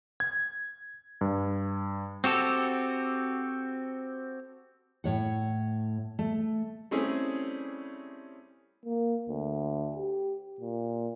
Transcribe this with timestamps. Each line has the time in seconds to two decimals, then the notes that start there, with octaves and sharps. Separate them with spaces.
0.20 G#6
1.21 G2
2.24 C4 F#4 G4 A4
5.04 A2 C#5 F#5
6.19 A3
6.91 G3 A3 C4 C#4 E4 G#4
8.86 A#3
9.29 D2
9.96 G4
10.60 A#2